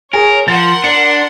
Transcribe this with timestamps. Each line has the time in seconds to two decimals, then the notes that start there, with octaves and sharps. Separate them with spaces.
0.13 G#4 A#4 C#5
0.48 F3 A#4 F#5 C6 A6
0.84 D4 C#7